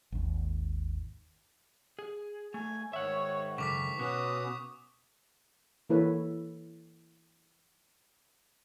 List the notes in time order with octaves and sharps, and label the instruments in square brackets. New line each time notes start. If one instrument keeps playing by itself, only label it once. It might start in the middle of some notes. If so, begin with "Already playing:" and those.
[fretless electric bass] G#1 D#2
[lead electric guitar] G#4
[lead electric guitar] A3 [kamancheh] G#5
[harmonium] G#2 D#3 [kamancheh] C#5 [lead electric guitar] E5 F#5
[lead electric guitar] F#2 C#3 [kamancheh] A4 [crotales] C#6 D6 B6
[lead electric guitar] B2 [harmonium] C#4 F#4 B4 [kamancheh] D#6
[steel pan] E3 A#3 E4 A4 B4 C#5